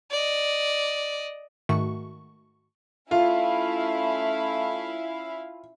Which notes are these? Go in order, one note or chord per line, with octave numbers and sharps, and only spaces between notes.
D5 D#5
G#2 D#3 A3 F#4 C#6
A3 C#4 E4 F4 F5